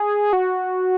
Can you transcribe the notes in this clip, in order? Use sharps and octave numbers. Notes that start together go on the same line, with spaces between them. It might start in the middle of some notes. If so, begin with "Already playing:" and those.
Already playing: G#4
F#4